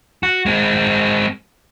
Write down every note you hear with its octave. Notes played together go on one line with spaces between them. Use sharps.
F#4
G#3 C4